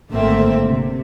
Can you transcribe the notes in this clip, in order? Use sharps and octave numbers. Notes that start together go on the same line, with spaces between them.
G#1 D3 A3 A#3 C4 E5
C3